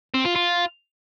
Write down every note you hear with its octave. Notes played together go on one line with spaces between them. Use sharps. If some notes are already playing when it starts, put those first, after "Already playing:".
C4
F4
F4